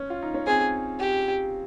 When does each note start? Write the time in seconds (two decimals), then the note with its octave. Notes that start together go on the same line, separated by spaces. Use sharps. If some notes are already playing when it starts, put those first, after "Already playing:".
Already playing: C#4
0.10 F4
0.23 D#4
0.34 C#4
0.47 C4 G#4
0.99 G4